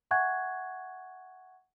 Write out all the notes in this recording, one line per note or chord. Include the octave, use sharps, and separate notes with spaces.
E5 F#5 G#5 C#6 F#6 G#6